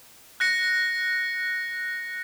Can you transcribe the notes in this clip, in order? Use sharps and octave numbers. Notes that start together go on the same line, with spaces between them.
F#6 A#6 C#7